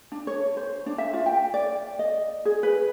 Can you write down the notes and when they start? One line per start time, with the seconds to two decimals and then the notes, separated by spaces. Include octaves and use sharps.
0.12 D4
0.27 C#5
0.57 C5
0.86 D4
0.98 E5
1.13 F4
1.26 G5
1.54 D5
1.99 D#5
2.45 G#4
2.63 B4